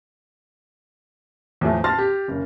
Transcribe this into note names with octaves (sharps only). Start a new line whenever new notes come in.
E2 A2 E3 F3 A3
A5 C6 F6 A6 A#6
G4
F#1 C#3